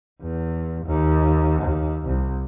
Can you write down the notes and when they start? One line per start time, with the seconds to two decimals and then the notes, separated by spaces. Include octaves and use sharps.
0.22 E2
0.86 D#2
1.62 D#2
2.06 C2